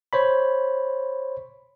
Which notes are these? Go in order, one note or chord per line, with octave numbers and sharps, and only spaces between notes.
C5 C#5 B5